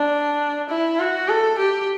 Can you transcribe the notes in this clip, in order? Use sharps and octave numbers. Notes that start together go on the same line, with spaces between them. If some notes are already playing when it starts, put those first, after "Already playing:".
Already playing: D4
E4
F#4
A4
G4